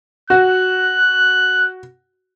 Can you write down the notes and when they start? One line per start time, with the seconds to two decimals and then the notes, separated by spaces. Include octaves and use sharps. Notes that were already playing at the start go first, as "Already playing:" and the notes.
0.30 F#4 F#6